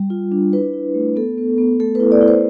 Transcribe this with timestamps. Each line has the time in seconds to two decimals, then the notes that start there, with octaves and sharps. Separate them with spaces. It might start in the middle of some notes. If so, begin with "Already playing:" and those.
Already playing: G3
0.10 F4
0.32 D4
0.53 E4 B4
0.73 E4
0.95 A3
1.16 B3 A4
1.38 B3
1.58 B3
1.80 A3 A4
1.95 B4
2.00 E4
2.12 D5
2.21 E4
2.28 C5